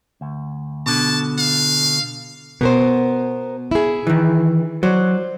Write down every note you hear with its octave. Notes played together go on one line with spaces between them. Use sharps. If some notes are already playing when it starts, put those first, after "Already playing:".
D2
B2 D3 A5
F5
B2 B3 A#4 C5
E4 G#4
D#3 E3
F#3 C5 D5